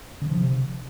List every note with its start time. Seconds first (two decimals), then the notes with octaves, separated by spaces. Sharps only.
0.22 D3
0.29 F3
0.37 C3